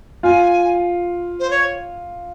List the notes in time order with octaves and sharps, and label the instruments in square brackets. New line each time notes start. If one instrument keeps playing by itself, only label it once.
[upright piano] F4 [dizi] G#5
[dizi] C5
C#5